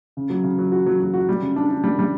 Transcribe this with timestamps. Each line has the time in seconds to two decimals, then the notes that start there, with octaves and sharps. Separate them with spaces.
0.17 C#3
0.30 F#3
0.44 C#3
0.59 F#3
0.72 F#4
0.86 F#3
1.00 F#3
1.14 F#4
1.29 G3
1.42 C#3
1.56 D4
1.71 D4
1.84 G3
1.99 G3